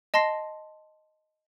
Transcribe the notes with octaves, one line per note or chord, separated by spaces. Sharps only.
D#5 A5 C6 A#6 C7